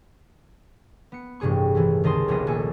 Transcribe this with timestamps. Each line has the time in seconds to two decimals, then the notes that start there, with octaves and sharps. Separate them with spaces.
1.12 B3 C#7
1.40 A1 G2 C3 G#4 C#6
1.75 D#3 E3 C#4 E4
2.04 C#2 D#3 D#5 A5 C6 D#6
2.28 D#1 A#1 B3 F4 D#5
2.47 A#1 A4 G#5 C#6